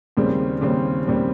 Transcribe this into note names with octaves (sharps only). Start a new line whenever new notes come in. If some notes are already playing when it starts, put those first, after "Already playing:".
D#2 C#3 G3 C4
D#2 C#3 G3 C4
D#2 C#3 G3 C4